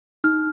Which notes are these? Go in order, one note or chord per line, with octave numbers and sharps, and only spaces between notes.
D#4 F6